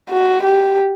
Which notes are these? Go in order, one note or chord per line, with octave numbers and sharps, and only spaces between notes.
F#4
G4